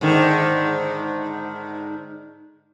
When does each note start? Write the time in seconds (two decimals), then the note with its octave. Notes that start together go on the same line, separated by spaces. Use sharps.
0.01 G#2 D3 D#3